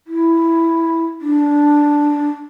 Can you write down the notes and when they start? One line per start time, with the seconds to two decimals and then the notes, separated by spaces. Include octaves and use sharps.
0.07 E4
1.21 D4